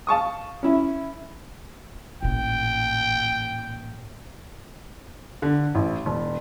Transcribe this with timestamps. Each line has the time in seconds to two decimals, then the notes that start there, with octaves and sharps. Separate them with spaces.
0.07 F5 A5 C#6 D#6
0.63 C#4 E4
2.22 A1 A#2 G5
5.42 D3
5.75 A1
6.06 E1